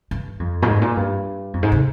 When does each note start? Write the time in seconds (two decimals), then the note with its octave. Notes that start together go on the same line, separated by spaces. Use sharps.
0.11 G2
0.40 F2
0.62 A#2
0.68 G#2
0.82 A#2
0.97 G2
1.54 F2
1.63 G#2
1.72 C3